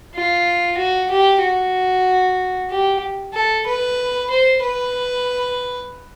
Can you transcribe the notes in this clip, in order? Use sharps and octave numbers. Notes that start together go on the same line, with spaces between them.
F4
F#4
G4
F#4
G4
A4
B4
C5
B4